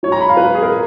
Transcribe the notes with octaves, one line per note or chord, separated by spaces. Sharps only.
G#2 F#3 C#5 A#5
B5
F5
G#2 F#3 B4
G#4
A#4
A#2